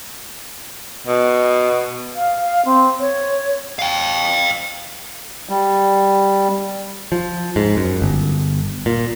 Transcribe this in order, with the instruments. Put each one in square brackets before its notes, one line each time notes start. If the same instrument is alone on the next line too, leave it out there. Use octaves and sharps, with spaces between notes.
[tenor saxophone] B2
[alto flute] F5
C4
C#5
[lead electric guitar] F5 G5
[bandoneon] G3
[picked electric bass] F3
G#2
F#2
G1
A#2